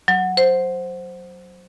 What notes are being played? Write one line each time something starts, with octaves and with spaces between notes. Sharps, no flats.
F#3
C5